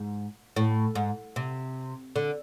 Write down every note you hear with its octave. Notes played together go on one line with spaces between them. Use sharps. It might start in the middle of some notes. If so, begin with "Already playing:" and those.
Already playing: G#2
A2
G#2
C3
D3